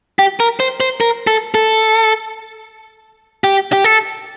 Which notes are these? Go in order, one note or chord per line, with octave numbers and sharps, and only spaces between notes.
G4
A#4
C5
C5
A#4
A4
A4
G4
G4
A4